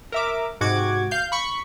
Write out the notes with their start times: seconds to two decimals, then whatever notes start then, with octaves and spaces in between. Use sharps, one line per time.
0.12 A#4 E5 D6
0.61 G#2 C3 F#4 D6 G#6
1.11 F5 G6
1.32 B5 C#6